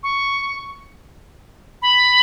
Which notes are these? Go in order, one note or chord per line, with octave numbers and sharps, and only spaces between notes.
C#6
B5